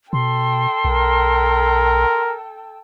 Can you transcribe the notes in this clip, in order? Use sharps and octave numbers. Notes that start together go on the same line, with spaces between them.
B2 A4 G5 C6
B1 A#4